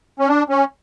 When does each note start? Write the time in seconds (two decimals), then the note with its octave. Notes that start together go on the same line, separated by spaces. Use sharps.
0.19 C#4
0.28 D4
0.49 C#4